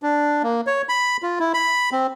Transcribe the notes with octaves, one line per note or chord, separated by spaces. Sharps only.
D4
A#3
C#5
B5
F4
E4
B5
C4